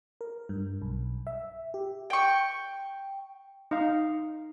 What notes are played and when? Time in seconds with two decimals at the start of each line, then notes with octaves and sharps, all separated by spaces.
0.21 A#4
0.49 G2
0.82 B1
1.27 E5
1.74 G4
2.10 G5 C#6
3.71 D#4 F5